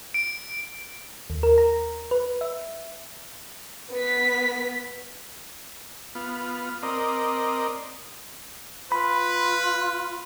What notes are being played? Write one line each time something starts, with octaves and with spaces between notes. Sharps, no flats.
D7
D#2
A#4
A#5
B4
E5
B3 B6
B3 F4
C4 A#4 D5 D#5
F4 B4 B5